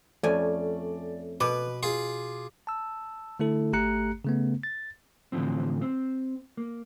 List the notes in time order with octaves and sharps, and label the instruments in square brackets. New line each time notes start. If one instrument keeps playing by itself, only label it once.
[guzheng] F2 G#5 [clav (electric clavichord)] A3 C#4 [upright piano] D5
[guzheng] B2 [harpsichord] B4 [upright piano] D6
[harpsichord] F4 G#4
[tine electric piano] A5 E6
D3 A3 E4 A4
G#1 A3 G4 A#5 F#6 C#7
C#3 A3 B3
A6
[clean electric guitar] A2 D3 E3 F3 C4
C4
A#3